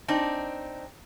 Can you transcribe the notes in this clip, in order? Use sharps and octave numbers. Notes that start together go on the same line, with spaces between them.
C4 D4 D#4